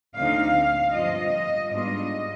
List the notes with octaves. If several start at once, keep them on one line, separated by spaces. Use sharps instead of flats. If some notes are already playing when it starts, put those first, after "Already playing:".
D2 D3 F3 C4 D#4 F5
G2 F3 C4 F4 D#5
G#2 G3 B3 D4 F4 D#5